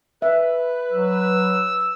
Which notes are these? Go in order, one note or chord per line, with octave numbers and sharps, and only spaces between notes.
B4 E5
F#3 E6